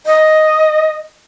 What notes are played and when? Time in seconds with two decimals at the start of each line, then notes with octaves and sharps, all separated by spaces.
0.06 D#5